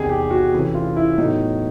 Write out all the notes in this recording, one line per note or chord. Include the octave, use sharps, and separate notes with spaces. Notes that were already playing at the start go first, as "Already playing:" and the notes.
Already playing: E2 C3 D#3 G#4
G4
F#4
C3 E3 A3 C#4
F4
E4
A2 F#3 B3 D#4